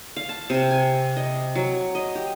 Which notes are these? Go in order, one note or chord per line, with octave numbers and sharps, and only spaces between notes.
F5
A5
C3
G#5
D#5
F#3
D#5
G4